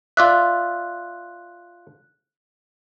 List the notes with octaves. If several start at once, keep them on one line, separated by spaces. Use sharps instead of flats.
F4 D5 E5 F#6